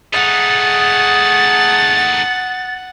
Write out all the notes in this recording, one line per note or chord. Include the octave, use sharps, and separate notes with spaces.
A3 D#4 G#4 F#5 A6